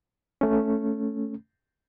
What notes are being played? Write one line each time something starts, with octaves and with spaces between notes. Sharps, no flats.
A3 C#4